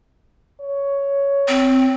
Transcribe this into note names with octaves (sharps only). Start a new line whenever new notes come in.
C#5
C4